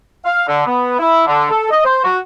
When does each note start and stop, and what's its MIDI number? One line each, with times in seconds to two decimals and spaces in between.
0.25 0.43 77
0.47 0.62 50
0.66 0.98 59
0.99 1.24 64
1.27 1.50 50
1.50 1.70 69
1.70 1.80 75
1.84 2.00 72
2.03 2.17 66